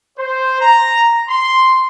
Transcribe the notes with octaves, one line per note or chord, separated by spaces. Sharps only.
C5
A#5
C6